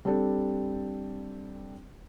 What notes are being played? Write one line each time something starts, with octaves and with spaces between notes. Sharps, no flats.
G3 C4 D4 G4 A4